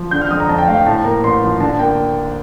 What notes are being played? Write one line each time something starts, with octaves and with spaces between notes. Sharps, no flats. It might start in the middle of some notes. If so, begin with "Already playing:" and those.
Already playing: F3
D3 G6
F6
F2 D#6
A#5
F2 A5
G5
A3 F5
G5
A2 A5
A#3 A#5
A1 C6
F3
D3 A5
A#3 G5